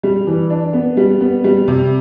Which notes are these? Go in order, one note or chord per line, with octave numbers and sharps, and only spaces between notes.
G3
E3
D4
B3
G3
B3
G3
C3